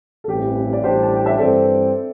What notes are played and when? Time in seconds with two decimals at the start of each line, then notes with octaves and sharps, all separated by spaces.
0.24 A4
0.28 A1 G2 E3 C4 G4
0.73 D5
0.83 A1 A2 G3 D4 G4 C5
1.03 A5
1.15 G5
1.26 E5
1.38 G2 E3 C4 A4 D5